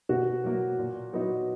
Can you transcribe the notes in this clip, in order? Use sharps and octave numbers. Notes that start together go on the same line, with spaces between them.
B2 F#4
F#3 A#3
A#2
F#3 B3 D#4